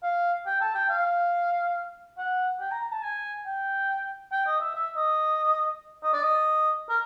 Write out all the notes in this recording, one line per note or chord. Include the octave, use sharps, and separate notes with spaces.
F5
G5
A5
G5
F5
F#5
G5
A#5
A#5
A5
G#5
G5
G5
D#5
E5
E5
D#5
D#5
D5
D#5
A#4